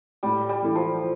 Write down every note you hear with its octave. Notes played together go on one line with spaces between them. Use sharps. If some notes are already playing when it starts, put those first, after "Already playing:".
A2 G3
G3
E3 A3 E4
F3